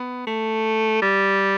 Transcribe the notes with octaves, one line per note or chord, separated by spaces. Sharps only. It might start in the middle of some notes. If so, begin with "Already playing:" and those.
Already playing: B3
A3
G3